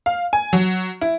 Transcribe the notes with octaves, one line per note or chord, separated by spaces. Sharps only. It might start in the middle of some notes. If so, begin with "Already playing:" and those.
F5
G#5
F#3
E4